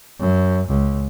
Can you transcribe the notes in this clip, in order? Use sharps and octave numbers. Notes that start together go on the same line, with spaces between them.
F#2
C#2